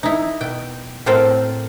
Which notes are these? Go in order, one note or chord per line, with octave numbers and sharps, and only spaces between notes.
D#4 E4
B2 G5
A2 C4 A4 A#4 C5 G5